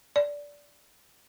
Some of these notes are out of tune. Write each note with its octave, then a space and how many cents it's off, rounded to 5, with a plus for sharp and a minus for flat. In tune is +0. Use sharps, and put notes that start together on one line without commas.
D5 -15